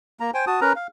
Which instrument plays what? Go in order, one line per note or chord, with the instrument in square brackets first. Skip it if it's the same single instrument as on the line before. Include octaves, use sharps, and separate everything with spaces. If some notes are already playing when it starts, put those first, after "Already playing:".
[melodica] A#3 A#5
C5 G5 G#5
F#4 A5 D#6
C#4 A#4 B4 A#5
F5